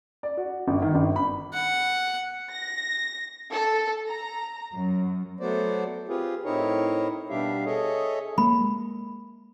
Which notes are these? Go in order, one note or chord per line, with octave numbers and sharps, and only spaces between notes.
D5
F#4
G1
D#3
G1
B5
F#5
A#6
A4
A#5
F#2
F#3 A3 B3 C5 D5
C4 F4 G4 G#4 B4
A2 C4 D#4 E4 A#4 C#5
B2 G3 D4 G4 E5 F5
G#4 A4 C#5 D#5 E5
G#3 A#3 B5